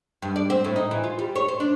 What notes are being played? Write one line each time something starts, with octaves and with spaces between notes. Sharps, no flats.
G2
D5
C4
A2
D#4
E3
F4
G3
C#5
C5
D4